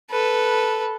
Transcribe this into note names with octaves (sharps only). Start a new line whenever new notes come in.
A4 B4